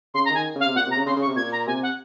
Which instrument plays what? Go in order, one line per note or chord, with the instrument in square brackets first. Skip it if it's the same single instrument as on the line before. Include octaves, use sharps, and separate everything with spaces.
[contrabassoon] C#3 [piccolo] C6
[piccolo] A#5
[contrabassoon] D#3 [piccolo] G#5
[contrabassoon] C#3 [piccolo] F5
[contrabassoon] C3
[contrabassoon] A#2 [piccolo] F#5
[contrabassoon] C3 [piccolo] A#5
[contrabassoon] C#3
[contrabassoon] C#3 [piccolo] C6
[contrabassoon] C#3 [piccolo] C#6
[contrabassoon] C3
[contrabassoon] A#2 [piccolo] G#6
[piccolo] A#5
[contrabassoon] C3 [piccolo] G#5
[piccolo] F#5